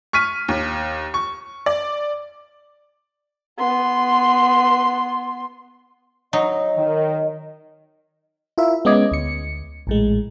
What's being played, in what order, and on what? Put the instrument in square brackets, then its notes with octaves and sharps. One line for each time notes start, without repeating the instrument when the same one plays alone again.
[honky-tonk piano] C#6 F6 B6 D#7
D#2
C#6
D5
[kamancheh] B3 C6
[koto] F#3 D#4 [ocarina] D#5
[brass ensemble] D#3
[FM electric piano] E4 F4 A#4 E5
G#3 B3 C#4 D#5 D6 G#6
D2 C#7
A#1 A2 G#3